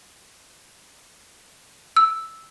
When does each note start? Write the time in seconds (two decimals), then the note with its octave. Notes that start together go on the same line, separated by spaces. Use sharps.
1.96 E6